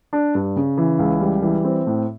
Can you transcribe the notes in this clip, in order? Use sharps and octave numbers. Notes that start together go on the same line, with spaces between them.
D4
G2
C#3
E3
C#2
G3
E3
C4
A2